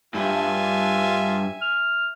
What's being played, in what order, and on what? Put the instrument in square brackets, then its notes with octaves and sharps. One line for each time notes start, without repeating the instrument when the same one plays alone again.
[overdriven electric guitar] G2 [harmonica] F4 [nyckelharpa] E5 G#5
[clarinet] F6